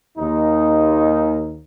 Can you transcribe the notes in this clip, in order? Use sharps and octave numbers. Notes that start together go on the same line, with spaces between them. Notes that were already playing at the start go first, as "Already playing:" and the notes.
D#2 D#4